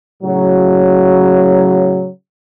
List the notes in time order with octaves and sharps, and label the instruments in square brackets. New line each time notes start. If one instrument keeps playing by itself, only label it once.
[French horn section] A2 C#3 F#3